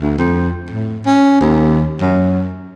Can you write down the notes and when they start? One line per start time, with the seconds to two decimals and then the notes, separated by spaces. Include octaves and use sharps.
0.02 D2
0.18 F2
0.71 A2
1.06 C#4
1.41 D#2
2.01 F#2